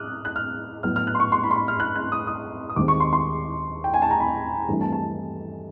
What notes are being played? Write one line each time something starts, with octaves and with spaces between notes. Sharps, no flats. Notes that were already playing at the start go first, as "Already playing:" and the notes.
Already playing: D6 D#6 F6 F#6
F#6
F6
A2 F#3 B3 F6
F6
F#6
C6
C#6
C6
B5
C6
B5
F6
F#6
F#6
D#6
D#6
D#6
D#2 D#3 G#3 C4 D6
C#6
C6
C6
G5
G#5
A5
A#5
B5
G2 E3 A3 C4
A5
A5